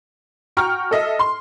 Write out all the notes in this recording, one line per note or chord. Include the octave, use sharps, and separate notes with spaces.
F#4 G5 A#5 C#6 F6
A4 D#5 E5
C6